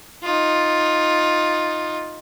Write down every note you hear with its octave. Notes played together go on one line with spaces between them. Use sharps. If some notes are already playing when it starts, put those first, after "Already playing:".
D#4 F4